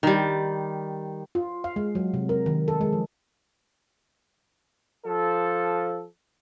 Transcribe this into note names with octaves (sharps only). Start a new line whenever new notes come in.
D#3 G3
F4
F5
G#3
F#3
C3
A#4
D#3
A4
G#3
F3
F3 A4